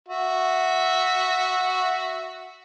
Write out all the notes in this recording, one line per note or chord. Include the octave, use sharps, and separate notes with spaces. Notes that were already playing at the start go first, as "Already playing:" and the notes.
F#4 E5